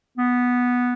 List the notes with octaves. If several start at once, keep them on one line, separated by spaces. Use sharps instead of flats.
B3